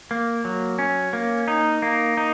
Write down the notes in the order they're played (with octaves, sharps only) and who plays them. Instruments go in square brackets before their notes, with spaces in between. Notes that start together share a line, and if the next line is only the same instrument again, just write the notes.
[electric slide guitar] A#3
F#3
C#4
A#3
D#4
A#3
D#4